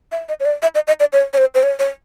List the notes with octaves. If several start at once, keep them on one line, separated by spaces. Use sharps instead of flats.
E5
D#5
C#5
D5
E5
D#5
D#5
D5
C#5
C#5
C5
C5
C#5
C#5